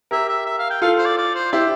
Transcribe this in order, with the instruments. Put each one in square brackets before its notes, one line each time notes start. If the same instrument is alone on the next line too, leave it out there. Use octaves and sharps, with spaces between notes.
[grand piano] G4 A#4 [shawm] E5
[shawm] E5
E5
F5
G5
[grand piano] F4 A4 [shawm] F5
[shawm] C5
D5
D5
C5
[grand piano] E4 G4 [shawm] C5